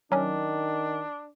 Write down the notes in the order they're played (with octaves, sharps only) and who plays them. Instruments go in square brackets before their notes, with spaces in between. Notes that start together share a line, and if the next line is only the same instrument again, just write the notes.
[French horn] D#3 [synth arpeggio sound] F#3 C#4 [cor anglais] D4